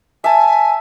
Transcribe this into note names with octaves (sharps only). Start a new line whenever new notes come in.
E5 G#5 A5